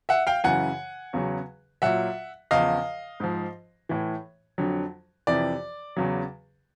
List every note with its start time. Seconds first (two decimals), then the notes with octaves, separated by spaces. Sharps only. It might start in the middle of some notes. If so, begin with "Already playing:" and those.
0.09 E5 F#5
0.27 F5 G5
0.44 F#2 C#3 E3 F#5 G#5
1.13 E2 C#3 F#3
1.82 A#2 F#3 E5 F#5
2.51 E2 C#3 F3 D#5 F5
3.20 G#2 F3
3.89 A2 E3
4.58 F2 D3 F#3
5.27 F2 C3 E3 D5
5.96 E2 C#3 F#3